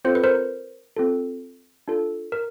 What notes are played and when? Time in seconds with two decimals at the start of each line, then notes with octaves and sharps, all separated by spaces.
0.05 C4 F4 A4 C5
0.15 B4
0.24 A#4 C5
0.97 C4 F4 A4
1.88 D4 F4 A4
2.32 A#4